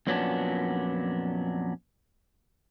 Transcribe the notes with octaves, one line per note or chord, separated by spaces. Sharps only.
F2 A#2 F#3 B3 C#4 D4